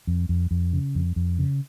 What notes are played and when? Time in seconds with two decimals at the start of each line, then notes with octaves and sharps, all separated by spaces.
0.07 F2
0.29 F2
0.51 F2
0.73 C#3
0.95 F2
1.16 F2
1.39 C#3